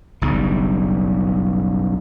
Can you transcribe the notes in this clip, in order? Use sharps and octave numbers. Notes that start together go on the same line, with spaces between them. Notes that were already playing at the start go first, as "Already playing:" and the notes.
F#1 B1 G2